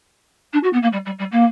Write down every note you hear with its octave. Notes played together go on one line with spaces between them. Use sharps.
D4
F#4
B3
A#3
G3
G3
G3
A#3